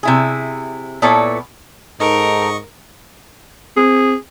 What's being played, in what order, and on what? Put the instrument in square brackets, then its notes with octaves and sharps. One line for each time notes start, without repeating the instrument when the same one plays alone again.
[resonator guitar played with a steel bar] C3 E4 G#4
A#2 B3 E4 A4 C#5 D5
[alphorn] G#2 [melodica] D#4 A4 [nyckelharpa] A#4 [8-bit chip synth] D#5 C#6
[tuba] C4 [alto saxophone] G#4